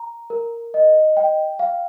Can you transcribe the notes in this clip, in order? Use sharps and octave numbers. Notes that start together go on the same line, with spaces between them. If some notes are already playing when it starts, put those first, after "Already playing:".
Already playing: A#5
A#4
D#5
G5
F5